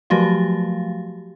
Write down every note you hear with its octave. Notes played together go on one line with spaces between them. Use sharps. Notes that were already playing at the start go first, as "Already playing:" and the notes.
F3 F#3 A3 F#4 G4 F5